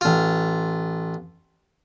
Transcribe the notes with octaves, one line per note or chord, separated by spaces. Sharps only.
A1 F4